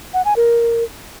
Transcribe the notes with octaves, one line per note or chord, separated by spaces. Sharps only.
F#5
G#5
A#4